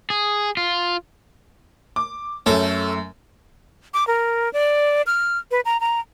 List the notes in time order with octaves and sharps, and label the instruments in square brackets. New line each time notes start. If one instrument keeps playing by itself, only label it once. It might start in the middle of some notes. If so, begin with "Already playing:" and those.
[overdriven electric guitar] G#4
F4
[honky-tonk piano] D6
[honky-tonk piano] F#2 A3 [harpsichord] C#4 A4
[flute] D6
A#4
D5
F6
B4
A#5
A#5